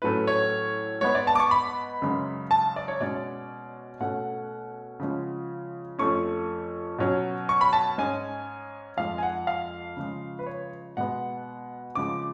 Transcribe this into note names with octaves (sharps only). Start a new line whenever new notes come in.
A2 F#3 A3 C#4 B4
C#5
G#2 G#3 B3 C#5
D5
A5
D6
C#6
B5
F#2 C#3 G#3 C#4
A5
D5
C#5
B2 G#3 C#4 D5
B2 A3 C#4 F#5
C#3 F3 G#3 C#4
F2 F3 A3 C#4 C#6
B2 F#3 C#4
C#6
B5
A5
G#2 G#3 C#4 G#5
F2 F3 G#3 F5
G#5
F#5
F5
C#3 F3 G#3
B4
C#5
B2 G#3 B3 F#5
C#3 F3 G#3 D6